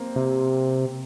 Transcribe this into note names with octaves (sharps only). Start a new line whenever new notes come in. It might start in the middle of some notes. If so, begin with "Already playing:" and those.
Already playing: A#3 C4
C3